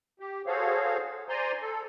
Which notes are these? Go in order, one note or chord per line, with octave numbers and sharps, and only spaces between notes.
G4
F#4 G#4 A4 C5 C#5 F5
C5 D5 G#5 A#5 C6
A4